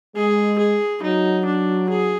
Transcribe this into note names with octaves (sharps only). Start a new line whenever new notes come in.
G#3 G#4
G#4
F#3 D#4
D4
G#4